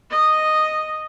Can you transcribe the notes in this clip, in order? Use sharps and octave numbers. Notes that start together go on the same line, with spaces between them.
D#5